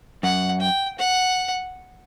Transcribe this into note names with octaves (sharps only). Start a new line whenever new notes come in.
F#2 F#5
G5
F#5